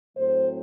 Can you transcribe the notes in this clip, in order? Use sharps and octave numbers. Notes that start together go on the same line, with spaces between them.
A2 F#3 C4 C5